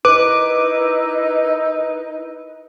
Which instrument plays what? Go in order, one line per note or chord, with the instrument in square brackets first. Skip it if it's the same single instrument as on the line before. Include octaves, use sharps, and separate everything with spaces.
[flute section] D#4 E4 A#4 [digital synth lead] B4 [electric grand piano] D6